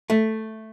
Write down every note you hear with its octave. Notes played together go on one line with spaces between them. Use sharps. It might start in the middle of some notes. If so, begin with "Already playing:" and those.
A3